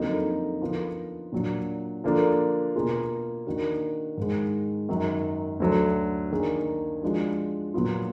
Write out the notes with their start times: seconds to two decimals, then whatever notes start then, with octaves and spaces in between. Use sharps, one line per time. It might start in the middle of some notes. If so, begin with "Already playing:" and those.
Already playing: F2 D3 F#3 A#3 D#4
0.61 D3 F3 B3 F4 A#4
1.32 A#2 F#3 D4
2.04 D3 F3 A#3 D4
2.75 B2 A#3 F4 G#4
3.47 D#3 A#3 D4 F#4 A#4
4.17 G#2 D#3 G#3
4.89 F#2 D#3 F#3
5.60 D2 D3 F#3 D4
6.31 D#3 A#3 D4 G#4
7.03 F3 G#3 D4 F#4
7.74 A#2 F#3 B3 F4